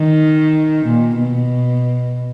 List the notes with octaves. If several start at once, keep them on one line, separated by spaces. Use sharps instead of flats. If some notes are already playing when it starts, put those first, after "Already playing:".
Already playing: D#3
A#2
B2